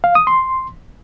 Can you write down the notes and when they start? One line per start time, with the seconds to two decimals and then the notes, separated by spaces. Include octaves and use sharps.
0.04 F5
0.15 D#6
0.27 C6